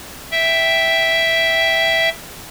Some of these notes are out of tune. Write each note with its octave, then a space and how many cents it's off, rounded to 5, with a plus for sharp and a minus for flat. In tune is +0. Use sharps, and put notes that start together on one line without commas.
E5 +0 G5 +0